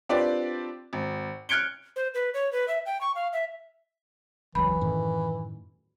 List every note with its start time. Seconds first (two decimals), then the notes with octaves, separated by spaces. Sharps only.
0.09 C4 D4 F4 G4 B4 D5
0.93 G#1
1.49 F6 F#6 G#6 C#7 D7 G7
1.96 C5
2.14 B4
2.34 C#5
2.52 B4
2.68 E5
2.86 G5
3.01 C#6
3.15 F5
3.33 E5
4.55 E1 C#2 E3 F#3 B5
4.81 F#2 A2 D#3